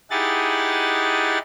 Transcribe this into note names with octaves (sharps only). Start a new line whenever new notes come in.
D#4 E4 G4 G#4 F#5 A6